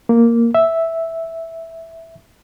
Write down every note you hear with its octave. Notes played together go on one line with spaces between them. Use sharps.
A#3
E5